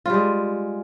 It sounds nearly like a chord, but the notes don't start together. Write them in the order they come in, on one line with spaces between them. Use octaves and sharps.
F4 G3 G#3